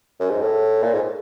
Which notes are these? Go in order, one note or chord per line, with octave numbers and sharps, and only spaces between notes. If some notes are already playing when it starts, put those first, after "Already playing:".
F#2
G#2
A2
A#2
G#2